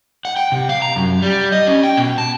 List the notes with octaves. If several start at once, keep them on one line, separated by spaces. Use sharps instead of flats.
F#5
G5
C3
F5
A#5
F#2
G3
D#5
C#4
G5
B2
A5